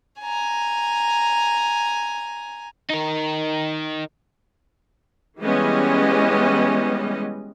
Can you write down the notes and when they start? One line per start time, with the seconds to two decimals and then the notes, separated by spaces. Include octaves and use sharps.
0.21 G#5 A#5
2.90 D#4 A#4
5.40 E3 G3 G#3 B3 C#4 D#5